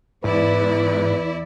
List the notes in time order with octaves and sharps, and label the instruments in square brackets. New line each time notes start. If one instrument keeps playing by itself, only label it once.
[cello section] E2 E4 D5 [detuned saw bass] G#2 [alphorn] B4